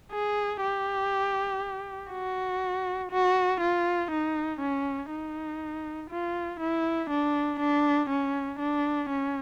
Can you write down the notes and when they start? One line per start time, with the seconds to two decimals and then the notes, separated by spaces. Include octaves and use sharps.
0.12 G#4
0.62 G4
2.11 F#4
3.11 F#4
3.61 F4
4.11 D#4
4.60 C#4
5.10 D#4
6.10 F4
6.60 E4
7.10 D4
7.60 D4
8.09 C#4
8.59 D4
9.09 C#4